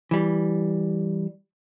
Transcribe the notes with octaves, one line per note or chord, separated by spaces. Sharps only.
E3 G3